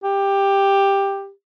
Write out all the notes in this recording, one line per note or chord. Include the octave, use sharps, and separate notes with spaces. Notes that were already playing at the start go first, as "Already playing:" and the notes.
G4